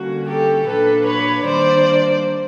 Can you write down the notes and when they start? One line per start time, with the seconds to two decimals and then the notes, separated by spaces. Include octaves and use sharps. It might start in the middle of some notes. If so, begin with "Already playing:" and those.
Already playing: D3 G3 A#3 C#4 F#4
0.28 G4 A4
0.67 A#2 F#3 A#3 D4 A4 B4
1.07 B4 C#5
1.45 D#3 G3 A#3 D4 C5 D5